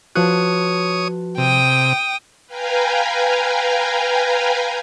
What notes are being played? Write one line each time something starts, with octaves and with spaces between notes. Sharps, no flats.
F3 F#4 B4 C#5 A5 D#6 F#6
C3 G5 D#6
B4 F5 G5 G#5 A#5